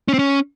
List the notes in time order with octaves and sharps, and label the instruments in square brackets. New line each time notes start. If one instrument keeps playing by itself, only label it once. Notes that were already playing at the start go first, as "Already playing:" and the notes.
[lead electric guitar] C#4
C4
C#4